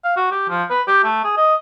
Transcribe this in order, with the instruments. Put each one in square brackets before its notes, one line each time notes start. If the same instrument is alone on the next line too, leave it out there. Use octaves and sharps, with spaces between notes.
[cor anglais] F5
F#4
G4
F3
B4
G4
A3
G#4
D#5